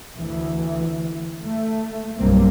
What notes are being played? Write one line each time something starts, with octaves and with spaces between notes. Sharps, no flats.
D2 E3
A3
B1 G2 F#3 G3 A#3 C4